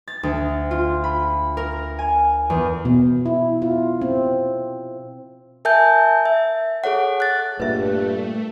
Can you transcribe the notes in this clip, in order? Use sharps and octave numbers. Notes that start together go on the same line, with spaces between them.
A6
D2
F4
B5
A#4
G#5
E2
B2
E4
F4
C4
A#4 E5 G#5 A5 G6
E5
G#4 A4 C#5 F#5
F#6 A6
G2 A#2 A3 B4 E5